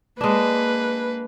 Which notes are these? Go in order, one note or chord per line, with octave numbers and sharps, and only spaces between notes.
G#3 A#3 D4 B4